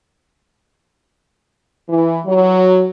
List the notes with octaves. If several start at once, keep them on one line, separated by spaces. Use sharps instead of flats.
E3
F#3